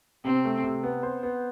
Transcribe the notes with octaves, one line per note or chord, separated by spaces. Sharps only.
C3 C4
A3
C3
B3
C5
B3